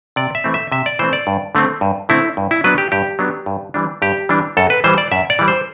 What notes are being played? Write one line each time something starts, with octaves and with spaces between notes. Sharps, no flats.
C3 D5
E5
E3 A3 C4
E5
C3 E5
D5
E3 A3 C4 C5
D5
G2
D3 A3 C4
G2
D3 A3 C4 E4
G2
E4
F#3 B3 D4 B4
G4
G2 G4
F#3 B3 D4
G2
E3 G3 D4
G2 G4
E3 G3 D4
F#2 A4
B4
E3 G3 C5
D5
F#2 E5
D5
E3 G3
C5